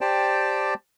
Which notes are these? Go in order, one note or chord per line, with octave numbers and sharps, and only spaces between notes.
G4 C5 D5 G5 A5